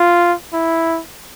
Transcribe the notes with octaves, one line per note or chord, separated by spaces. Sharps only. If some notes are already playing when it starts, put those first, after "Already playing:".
Already playing: F4
E4